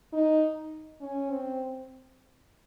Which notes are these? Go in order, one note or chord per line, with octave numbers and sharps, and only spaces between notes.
D#4
C#4
C4